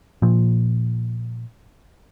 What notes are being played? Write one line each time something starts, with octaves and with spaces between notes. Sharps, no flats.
A#2 F3